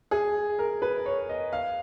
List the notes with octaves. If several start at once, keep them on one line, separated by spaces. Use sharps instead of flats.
G#4
A#4
B4
C#5
D#5
F5